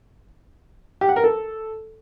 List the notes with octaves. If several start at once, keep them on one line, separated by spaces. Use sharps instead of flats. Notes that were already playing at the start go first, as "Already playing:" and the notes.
G4
F#5
A#4
A4